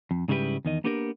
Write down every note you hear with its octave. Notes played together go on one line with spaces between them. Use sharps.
F2
G#2 C#3 G3 E4 G4 B4
E2 D#3 D#5
A#3 B3 D4 G4 A4 A#4